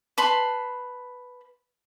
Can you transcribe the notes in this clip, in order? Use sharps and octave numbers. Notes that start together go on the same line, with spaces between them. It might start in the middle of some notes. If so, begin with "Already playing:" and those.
B4 A5 B5 C6